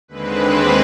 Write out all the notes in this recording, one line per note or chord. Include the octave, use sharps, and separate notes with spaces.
D#2 D3 G#3 C4 B4